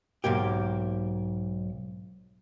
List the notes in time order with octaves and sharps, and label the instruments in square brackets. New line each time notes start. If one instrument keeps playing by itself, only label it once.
[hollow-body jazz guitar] B1 G#2 A#3 G4